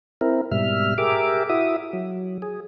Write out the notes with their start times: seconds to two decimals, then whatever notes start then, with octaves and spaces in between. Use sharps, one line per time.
0.21 C4 E4 A#4
0.51 G#2 B2 G3 E5 F6
0.98 G4 G#4 A#4 E5 D6
1.49 E4 F#4 E5 D#6
1.93 F#3
2.42 G#4